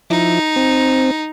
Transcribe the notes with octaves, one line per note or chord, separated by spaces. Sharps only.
F3 D#4 E4
C4